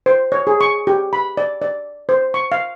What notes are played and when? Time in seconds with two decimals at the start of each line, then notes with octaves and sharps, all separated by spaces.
0.06 C5
0.32 C#5
0.47 G#4
0.61 C#6
0.87 G4
1.13 B5
1.37 D5
1.62 D5
2.09 C5
2.34 C#6
2.52 F5